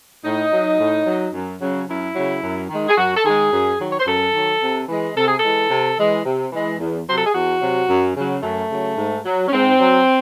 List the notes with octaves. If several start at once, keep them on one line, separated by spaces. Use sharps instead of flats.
A2 D#4
F#3
A2
F#3
F#2
C#3 F#3
F#2 E4
C#3 F#3
F#2
D#3 G#3
G#4
F#2 F#4
A4
D#3 G#3 G#4
F#2
D#3 F#3
C#5
C5
F#2 A4
D#3 F#3
C3
E3 G#3
C3 A4
G#4
A4
E3 G#3
C3
E3 G#3
C3
E3 G#3
E2
C3 F#3 C5
A4
G#4
E2 F#4
C3 F#3
F#2
C#3 F#3
F#2 A3
C#3 F#3
G#2
F#3
C#4
G#2 C4
F#3